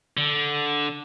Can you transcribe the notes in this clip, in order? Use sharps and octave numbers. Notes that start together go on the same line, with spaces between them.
D3